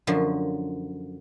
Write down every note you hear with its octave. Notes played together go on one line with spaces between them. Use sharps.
F#2 D3 F3